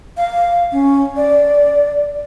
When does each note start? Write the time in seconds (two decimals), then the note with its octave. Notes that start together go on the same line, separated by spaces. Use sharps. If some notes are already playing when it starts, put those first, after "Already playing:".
0.17 F5
0.72 C#4
1.16 D5